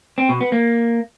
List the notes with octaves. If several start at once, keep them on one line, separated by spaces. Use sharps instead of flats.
C4
B2
B3
A#3